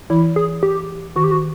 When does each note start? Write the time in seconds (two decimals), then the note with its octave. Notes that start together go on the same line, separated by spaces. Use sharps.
0.10 E3 E4
0.36 G#4
0.63 G4
1.16 D#3 F#4
1.24 G4
1.31 F#4